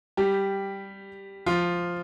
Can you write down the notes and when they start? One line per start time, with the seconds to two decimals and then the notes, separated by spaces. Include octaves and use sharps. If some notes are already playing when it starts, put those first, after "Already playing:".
0.17 G3 G4
1.46 F3 F4